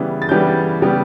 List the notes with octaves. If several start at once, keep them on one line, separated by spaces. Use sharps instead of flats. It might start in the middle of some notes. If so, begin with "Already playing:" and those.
Already playing: C#3 E3 G3 B3
A6
C#3 E3 G3 B3 G6
C#3 G3 B3